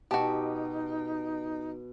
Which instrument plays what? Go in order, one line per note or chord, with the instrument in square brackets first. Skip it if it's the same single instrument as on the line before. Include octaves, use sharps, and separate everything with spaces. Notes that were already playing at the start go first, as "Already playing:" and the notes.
[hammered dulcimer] B2 [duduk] D#4 [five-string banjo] F#4 A5 [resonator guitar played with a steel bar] G4